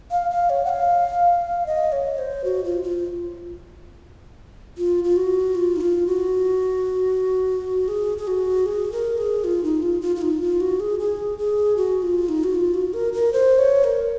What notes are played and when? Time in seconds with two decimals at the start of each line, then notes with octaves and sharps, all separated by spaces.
0.11 F5
0.31 F5
0.50 C#5
0.65 F#5
0.69 F5
1.66 D#5
1.92 C#5
2.18 C5
2.44 F#4
2.64 F4
2.83 F4
4.77 F4
5.04 F4
5.16 F#4
5.55 F4
5.76 D#4
5.81 F4
6.07 F#4
7.88 G#4
8.18 G#4
8.27 F#4
8.66 G#4
8.92 A#4
9.18 G#4
9.44 F4
9.64 D#4
9.82 F4
10.02 F4
10.16 F4
10.22 D#4
10.41 F4
10.60 F#4
10.80 G#4
10.99 G#4
11.38 G#4
11.77 F#4
12.02 F4
12.29 D#4
12.44 F#4
12.54 F4
12.74 F#4
12.94 A#4
13.13 A#4
13.33 C5
13.58 C#5
13.84 A#4